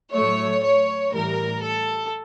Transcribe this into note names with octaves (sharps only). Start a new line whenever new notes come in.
A2 F#3 A3 C#5
C#5
A2 E3 G3 A#4
A4